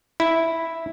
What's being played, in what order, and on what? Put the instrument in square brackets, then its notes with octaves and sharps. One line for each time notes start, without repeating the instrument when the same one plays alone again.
[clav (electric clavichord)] E4